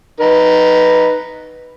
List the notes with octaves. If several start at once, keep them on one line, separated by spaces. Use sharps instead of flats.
D#4 B4